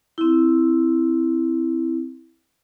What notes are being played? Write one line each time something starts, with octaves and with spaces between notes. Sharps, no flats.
C4 E4